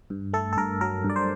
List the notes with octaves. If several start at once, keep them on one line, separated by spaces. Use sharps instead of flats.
G2
A3 A4
A4
G2 A#4
F#3 A#4
G2
D5
C5